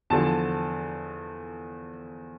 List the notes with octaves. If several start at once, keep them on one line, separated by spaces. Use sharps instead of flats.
E2 D3 F3 A5